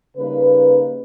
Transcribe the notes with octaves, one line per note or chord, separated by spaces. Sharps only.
C#3 G3 A#3 D#4 B4